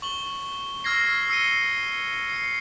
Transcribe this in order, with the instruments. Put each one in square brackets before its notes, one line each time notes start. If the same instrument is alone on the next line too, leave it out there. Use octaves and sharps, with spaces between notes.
[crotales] C#6 F#7 G7
C#6 E6 F6 G#6 A#6 C7
E6 C7 C#7 D#7 G7
C7 C#7